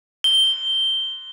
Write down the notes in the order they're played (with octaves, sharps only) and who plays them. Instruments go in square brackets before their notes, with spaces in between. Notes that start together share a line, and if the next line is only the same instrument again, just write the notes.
[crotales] G7